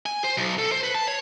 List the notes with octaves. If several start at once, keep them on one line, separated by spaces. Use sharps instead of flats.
G#5
C5
B1
A4
C5
B4
A5
C#5